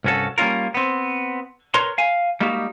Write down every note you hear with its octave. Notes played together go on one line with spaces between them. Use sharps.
C2 G2 C#4 F#4 A4
G3 A#3 C4 C#4 F4 A#4
B3 C4
A#4 B4 C#5 A#5 C6
F5 G#5
G3 G#3 A#3 D#4 F#4 G4